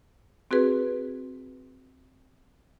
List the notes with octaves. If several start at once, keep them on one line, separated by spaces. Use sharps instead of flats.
C4 F#4 G#4 B4